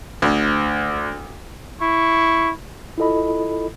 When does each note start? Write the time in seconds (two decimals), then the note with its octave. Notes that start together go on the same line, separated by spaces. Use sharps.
0.22 D2
1.81 E4 C#6
2.98 E4 F4 A4 D#5 B5